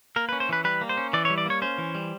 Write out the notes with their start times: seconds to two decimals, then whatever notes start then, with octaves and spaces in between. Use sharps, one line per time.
0.16 A#3 A#4
0.29 B4
0.32 C#4
0.40 C5
0.49 E3 B4
0.64 G3 B4
0.81 A#3
0.89 C5
0.97 C#4
1.13 E3 D5
1.25 C#5
1.30 G3
1.38 D5
1.46 A#3 C#5
1.62 C#4 C5
1.78 E3
1.95 G3